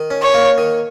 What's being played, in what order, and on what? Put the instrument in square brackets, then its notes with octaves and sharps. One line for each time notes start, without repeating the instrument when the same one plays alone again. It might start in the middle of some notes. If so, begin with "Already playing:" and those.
Already playing: [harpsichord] D#3
C#4
[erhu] C#5
[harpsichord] A#3
D#3